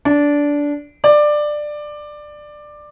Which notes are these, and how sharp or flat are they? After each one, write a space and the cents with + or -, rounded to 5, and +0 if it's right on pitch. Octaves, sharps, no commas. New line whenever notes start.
D4 -15
D5 +15